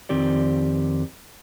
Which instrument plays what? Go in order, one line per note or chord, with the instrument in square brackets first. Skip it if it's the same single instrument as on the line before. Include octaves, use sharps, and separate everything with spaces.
[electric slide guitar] F2 D#3 C4 G4 D5